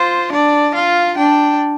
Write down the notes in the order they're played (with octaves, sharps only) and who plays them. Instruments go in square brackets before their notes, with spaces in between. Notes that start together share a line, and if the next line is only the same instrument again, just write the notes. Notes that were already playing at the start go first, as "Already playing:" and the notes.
Already playing: [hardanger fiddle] F4 [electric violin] C5
[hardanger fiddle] D4 [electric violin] D5
[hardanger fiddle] F4 [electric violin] F5
[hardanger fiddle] D4 [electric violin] G5